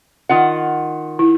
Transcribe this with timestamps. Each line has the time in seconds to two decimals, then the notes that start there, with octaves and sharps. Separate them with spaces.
0.29 D#3 F4 F#5
1.19 E4